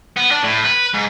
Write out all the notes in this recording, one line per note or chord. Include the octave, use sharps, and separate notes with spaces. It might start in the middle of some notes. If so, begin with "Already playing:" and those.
B3
D4
A2
B4
G#2